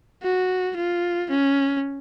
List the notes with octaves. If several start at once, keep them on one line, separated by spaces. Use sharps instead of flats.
F#4
F4
C#4